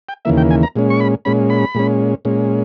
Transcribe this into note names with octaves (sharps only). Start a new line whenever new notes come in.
G5
D#2 C#3 E3 A#3 E5
G5
G#5
A#5
A#2 G#3 C#4
C#6
B5
A#2 G#3 C#4 B5
B5
A#2 G#3 C#4
A#2 G#3 C#4